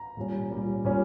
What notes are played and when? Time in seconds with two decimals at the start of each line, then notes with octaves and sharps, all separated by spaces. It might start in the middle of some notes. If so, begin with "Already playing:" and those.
Already playing: A#5
0.17 A#2 G3 C#4
0.51 A#2 G3 C#4
0.85 A#2 G3 C#4